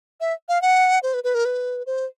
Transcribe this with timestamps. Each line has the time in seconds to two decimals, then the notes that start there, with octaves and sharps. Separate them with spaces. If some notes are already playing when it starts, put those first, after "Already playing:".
0.21 E5
0.49 F5
0.62 F#5
1.03 C5
1.14 B4
1.24 B4
1.35 A#4
1.45 B4
1.86 C5